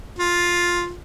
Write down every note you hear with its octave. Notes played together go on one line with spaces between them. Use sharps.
F4